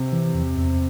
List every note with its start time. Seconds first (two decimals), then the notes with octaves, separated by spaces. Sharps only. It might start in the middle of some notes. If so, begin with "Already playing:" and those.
Already playing: C3
0.13 E3
0.34 E2
0.57 E2